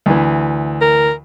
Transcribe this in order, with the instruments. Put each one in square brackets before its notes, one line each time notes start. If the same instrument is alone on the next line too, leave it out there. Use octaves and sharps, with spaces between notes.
[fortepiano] D2 E3
[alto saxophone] A#4